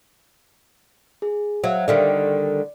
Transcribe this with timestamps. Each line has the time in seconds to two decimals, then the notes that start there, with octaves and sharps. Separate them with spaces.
1.22 G#4
1.64 F#3 C5 E5 F5
1.88 D3 D#3 G3 D5